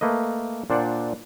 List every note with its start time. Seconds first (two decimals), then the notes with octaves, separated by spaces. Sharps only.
0.01 A3 A#3 B4 D#5
0.70 A#2 D4 C5 D5 F#5